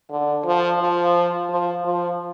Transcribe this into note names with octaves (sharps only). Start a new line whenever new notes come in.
D3
F3
F3
F3
F3